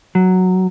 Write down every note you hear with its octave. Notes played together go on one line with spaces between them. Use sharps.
F#3